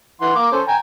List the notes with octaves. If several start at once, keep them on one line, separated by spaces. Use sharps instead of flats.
E3 F#5 C6
A#3 D6
C#4 A4 C5
G5 G#5 A#5